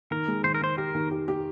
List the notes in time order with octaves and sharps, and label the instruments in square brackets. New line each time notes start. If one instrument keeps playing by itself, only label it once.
[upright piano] D#3 [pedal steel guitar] A#4
[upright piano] G#3
[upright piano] D#3 [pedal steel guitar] C5
[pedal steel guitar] A#4
[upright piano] D#3 [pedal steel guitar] C5
[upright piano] G4 [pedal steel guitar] A#4
[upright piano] D#3
G4
G4